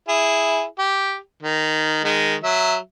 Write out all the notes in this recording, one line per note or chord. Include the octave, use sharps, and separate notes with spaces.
E4 G#4
G4
D#3
D#3 G#3
F#3 E5